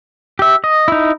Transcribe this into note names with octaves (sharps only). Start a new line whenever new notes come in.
G4 E5
D#5
D#4 E4